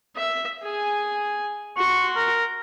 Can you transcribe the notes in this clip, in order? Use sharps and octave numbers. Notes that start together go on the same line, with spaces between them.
E5
G#4 G#5
F#4 C6 C#6
A#4